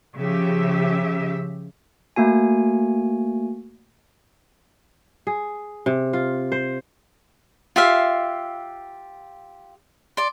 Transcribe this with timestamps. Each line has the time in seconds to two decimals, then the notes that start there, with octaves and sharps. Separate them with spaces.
0.16 C#3 F3 G4 E5
2.16 A3 A#3 F#4 G#5
5.27 G#4
5.86 C3
6.13 F4
6.52 C5
7.76 F4 G4 E5 F5
10.17 D5 C6